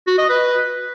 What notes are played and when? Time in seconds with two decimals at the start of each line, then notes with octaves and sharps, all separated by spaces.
0.07 F#4
0.18 D#5
0.29 B4